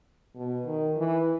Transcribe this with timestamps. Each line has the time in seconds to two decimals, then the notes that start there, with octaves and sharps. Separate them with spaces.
0.35 B2
0.66 D#3
0.98 E3